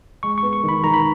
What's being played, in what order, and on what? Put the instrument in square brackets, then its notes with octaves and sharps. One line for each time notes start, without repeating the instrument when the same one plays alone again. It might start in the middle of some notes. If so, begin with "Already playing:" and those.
[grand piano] G#3 [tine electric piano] C#6
[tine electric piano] C#6
[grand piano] B3
[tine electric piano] C#6
[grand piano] D#3
[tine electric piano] B5
[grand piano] D#3 [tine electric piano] A#5
[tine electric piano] B5